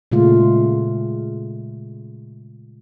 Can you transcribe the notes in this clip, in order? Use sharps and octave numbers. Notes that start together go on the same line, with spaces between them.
A#2 C#3 G#3 A3 F4